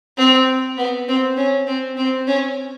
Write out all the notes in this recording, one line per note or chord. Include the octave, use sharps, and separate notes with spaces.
C4
B3
C4
C#4
C4
C4
C#4